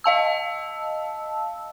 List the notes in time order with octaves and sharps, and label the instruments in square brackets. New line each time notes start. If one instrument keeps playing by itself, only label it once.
[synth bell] D#5 F5 A5 E6